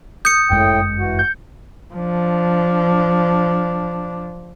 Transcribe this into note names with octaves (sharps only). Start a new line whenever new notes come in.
D#6 G6 C#7
G1 F#2 A2 G#3 G5
E3 F#4
G6
F3 D4